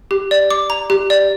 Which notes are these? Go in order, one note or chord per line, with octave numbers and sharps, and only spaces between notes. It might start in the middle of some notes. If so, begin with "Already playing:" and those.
G4
D5
D6
A#5
G4
D5